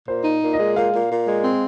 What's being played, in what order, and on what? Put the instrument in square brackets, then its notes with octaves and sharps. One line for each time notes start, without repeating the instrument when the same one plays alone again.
[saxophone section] A#2 [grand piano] C5
[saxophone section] D#4
A#2
[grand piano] D#5
[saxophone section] G#3
[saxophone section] A#2 [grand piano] F5
[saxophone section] A#2
A#2
G#3
C4